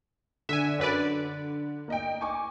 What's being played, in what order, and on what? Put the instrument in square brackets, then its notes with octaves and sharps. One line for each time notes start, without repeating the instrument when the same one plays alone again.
[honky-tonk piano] D3 [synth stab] E5 G#5
[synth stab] F#2 B4 D5
[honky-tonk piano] A#3 D#5 G5
G#5 C#6 D6